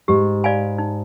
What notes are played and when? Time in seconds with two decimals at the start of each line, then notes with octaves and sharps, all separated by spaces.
0.08 G#2 G4
0.44 D5 F5 G#5 B5
0.78 D#4